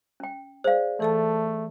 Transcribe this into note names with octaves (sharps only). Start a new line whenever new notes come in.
C#4 G5
G#4 C5 D5 F5
E3 A3 A4 A5